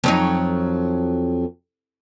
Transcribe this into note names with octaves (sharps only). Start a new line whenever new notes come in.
F2 F#3 D#4